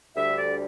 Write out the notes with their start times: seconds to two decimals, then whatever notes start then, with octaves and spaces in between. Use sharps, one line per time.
0.16 D2 D3 G3 E5
0.37 D5